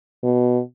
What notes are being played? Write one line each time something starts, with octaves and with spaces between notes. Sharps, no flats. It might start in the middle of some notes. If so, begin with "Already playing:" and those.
B2